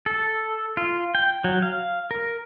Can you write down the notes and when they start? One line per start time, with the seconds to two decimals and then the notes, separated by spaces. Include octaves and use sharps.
0.06 A4
0.77 F4
1.15 G5
1.44 F#3
1.62 F5
2.11 A#4